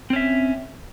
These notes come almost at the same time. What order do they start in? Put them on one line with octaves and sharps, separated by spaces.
C4 C#4 E5